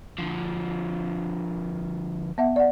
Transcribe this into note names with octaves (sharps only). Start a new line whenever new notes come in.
D3 F3
B3 E5 F#5
D5 F#5